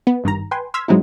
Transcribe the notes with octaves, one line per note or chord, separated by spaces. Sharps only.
B3
G#1 G2 D#3 A#5
B4 G5 G#5 C6
C6 E6 F6 G#6 B6
G#2 F#3 G#3 C4 D#4 E4